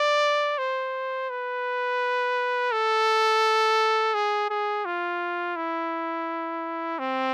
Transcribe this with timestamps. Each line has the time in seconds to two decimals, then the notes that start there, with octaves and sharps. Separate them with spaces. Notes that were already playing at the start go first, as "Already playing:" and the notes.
Already playing: D5
0.58 C5
1.30 B4
2.72 A4
4.14 G#4
4.50 G#4
4.85 F4
5.56 E4
6.99 C4